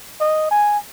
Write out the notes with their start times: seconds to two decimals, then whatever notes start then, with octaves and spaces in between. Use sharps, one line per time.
0.21 D#5
0.51 G#5